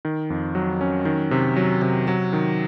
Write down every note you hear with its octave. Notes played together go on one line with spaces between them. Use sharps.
D#3
F2
F#3
C#4
D#3
C3
F#3
C3
F#3
D#3